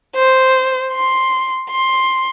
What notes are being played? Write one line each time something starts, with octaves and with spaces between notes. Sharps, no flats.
C5
C6
C6